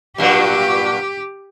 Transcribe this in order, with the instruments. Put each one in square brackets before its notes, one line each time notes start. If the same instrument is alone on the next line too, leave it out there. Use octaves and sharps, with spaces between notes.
[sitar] G2 A#2 F#3 [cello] G4